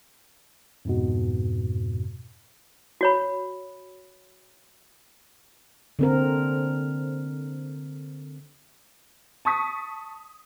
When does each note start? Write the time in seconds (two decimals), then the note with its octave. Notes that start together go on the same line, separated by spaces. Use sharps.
0.85 F2 G#2 B2
3.01 F#4 C#5 B5
5.99 D3 C4 A#4
9.45 A5 C#6 D#6 B6